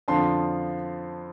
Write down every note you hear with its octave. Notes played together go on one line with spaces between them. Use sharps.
F2 D3 F3 A5 C6